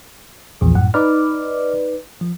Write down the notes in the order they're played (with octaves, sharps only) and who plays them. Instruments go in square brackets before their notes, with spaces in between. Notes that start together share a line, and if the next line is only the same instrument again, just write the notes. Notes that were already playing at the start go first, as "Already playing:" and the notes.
[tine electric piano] A#1 A#2 F3 [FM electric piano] E2
[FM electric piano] F#2 F#5 [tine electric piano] A2
[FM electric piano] D#4 B4 D5 [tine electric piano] D6 F6
[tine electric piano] F3